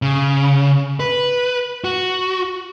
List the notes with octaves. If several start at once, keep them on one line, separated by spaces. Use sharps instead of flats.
C#3
B4
F#4